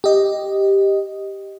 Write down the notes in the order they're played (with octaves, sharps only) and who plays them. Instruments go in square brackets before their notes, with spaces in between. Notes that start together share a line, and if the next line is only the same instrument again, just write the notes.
[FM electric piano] G4 D#5